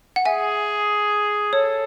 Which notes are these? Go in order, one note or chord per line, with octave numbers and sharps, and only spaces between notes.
F#5
G#4 E5 G#5
A4 C#5